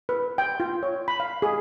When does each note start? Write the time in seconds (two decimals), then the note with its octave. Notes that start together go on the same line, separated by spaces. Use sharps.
0.09 B4
0.38 G5
0.60 F4
0.83 C#5
1.08 B5
1.20 F5
1.42 G#4